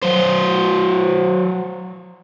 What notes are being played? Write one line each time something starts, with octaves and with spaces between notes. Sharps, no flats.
F#3 C5